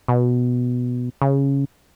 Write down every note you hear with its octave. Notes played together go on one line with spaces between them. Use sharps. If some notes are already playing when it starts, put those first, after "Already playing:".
B2
C#3